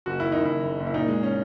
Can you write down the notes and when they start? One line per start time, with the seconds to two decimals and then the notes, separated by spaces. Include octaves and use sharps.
0.06 F#1 F#4
0.20 D#3 E4
0.32 F#1 D#4
0.45 F#1 E4
0.65 F#1
0.80 F#1
0.87 E4
0.94 A#2 D#4
1.08 G#3
1.23 C#4